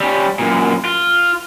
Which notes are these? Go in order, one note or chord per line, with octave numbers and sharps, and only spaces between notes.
G3 C#4
F#2 A#2
F4